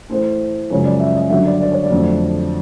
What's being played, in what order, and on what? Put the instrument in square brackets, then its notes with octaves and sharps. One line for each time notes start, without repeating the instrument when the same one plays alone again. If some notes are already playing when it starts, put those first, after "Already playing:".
[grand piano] A2 E3 A3 C5
F#2 C#3 F3 G#3 C#5
D5
E5
D#5
G2 D3 F#3 E5
D5
D5
C#5
D5
F2 D3 F#3 A3